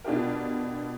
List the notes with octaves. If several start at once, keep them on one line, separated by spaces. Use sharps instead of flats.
B2 D4 F4 G4 A#4